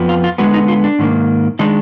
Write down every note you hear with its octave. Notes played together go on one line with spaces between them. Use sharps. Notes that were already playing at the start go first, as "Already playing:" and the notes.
Already playing: F2 F3 B3
F4
F4
D3 G#3 B3 F#4
D#4
F4
D4
G#2 D#3 A#3
D#3 G#3 D4 D#4